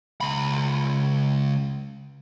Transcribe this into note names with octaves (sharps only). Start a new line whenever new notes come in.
C#2 B5